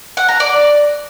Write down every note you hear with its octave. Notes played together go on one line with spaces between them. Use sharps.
F#5
A#5
D5